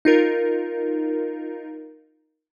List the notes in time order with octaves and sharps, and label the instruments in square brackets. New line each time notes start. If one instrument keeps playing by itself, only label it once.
[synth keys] D#4 F4 A#4